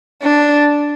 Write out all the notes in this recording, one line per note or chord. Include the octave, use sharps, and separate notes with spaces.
D4